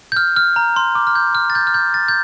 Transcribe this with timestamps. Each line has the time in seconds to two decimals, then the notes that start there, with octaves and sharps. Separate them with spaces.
0.12 G6
0.17 F6
0.36 F6
0.56 A#5
0.76 C6
0.95 D6
1.07 F6
1.15 G6
1.35 F6
1.50 A6
1.55 G6
1.67 F6
1.74 G6
1.94 A6
2.08 G6